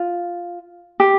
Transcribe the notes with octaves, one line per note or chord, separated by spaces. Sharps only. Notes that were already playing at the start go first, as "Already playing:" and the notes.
Already playing: F4
G4